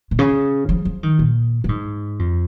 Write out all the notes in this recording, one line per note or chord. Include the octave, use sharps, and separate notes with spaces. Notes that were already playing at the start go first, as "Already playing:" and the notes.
A#2
C#3
F3
F3
D#3
A#2
A#2
G#2
F2